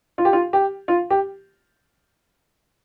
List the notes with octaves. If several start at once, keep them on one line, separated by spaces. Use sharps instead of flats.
F4
G4
F4
G4
F4
G4